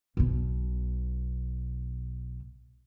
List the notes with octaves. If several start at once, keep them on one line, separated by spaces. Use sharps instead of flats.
B1 B2